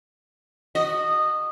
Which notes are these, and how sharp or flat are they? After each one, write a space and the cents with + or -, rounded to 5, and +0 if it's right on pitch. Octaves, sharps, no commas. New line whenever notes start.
F#4 +0 D#5 -15